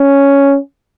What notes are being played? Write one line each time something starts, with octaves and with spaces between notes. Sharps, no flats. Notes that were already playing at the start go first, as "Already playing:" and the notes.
Already playing: C#4